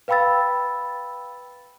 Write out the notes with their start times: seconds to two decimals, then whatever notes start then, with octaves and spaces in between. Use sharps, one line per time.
0.08 B4 F5 G5 B5 E6 A6